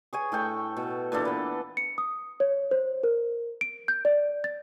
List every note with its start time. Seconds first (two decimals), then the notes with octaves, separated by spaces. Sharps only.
0.13 G#4 C#5 G#5
0.32 A2 A4 G5 C#6
0.77 B2
1.12 A#2 E3 D4 A4
1.25 B3 B4
1.77 C#7
1.98 D#6
2.40 C#5
2.71 C5
3.04 A#4
3.61 D7
3.88 G6
4.05 D5
4.44 A6